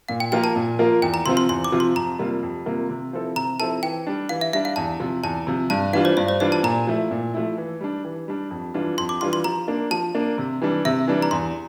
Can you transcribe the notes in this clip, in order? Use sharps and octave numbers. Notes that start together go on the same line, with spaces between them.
A#2 F5
G5
F3 A#3 F4 A#4 G5
A5
A#2
F3 A#3 F4 A#4
E2 G5
A#5
C3 F3 C4 F4 C6
C6
E2 C6
D6
C3 F3 C4 F4
C6
F2 A#5
C3 G3 A#3 F4
F2
C3 G3 A#3 F4
C3
F3 C4 E4 A4
C3 A#5
F3 C4 E4 A4 A5
E3 G5
G3 D4
E3 F5
E5
G3 D4 E5
F5
E2 A5
C3 F3
E2 A5
C3 F3
G2 A5
E3 G3 D4 F4 F5
C5
G2 D5
C5
E3 G3 D4 F4 D5
A5
A#2 A#5
F3 A3 E4
A#2
F3 A3 E4
E3
G3 D4
E3
G3 D4
F2
E3 G3 D4 F4
F2 C6
D6
E3 G3 D4 F4 C6
C6
F3 A#5
A#3 D4
F3 A5
A#3 D4
C3
E3 G3 D4
C3 E5
E3 G3 D4
A#5
E2 C6